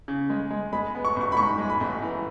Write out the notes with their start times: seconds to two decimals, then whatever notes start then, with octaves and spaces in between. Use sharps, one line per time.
0.08 C#3
0.30 G#3
0.50 G#3
0.73 G#3 B5
0.95 B3
1.05 C#6
1.16 A1 C#6
1.32 B5
1.37 G#2 C#6
1.58 G#3
1.70 B5
1.80 A1
2.02 E3